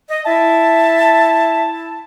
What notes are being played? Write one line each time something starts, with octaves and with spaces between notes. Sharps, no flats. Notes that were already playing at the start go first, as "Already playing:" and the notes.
D#5
E4 E5 A5